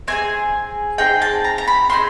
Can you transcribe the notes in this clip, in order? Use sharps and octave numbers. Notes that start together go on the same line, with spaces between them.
C4 D#4 G#4 G#5
C4 D#4 G#4 G5
A5
A#5
A#5
B5
C4 D#4 G#4 C6